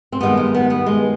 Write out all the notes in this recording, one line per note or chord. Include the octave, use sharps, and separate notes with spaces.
C4
G2 D#3 G#3 B3
G#3
B3
B3
G#3